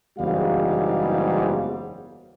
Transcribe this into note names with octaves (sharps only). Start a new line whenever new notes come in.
F#1 E2 G#2 G3 F#4 F5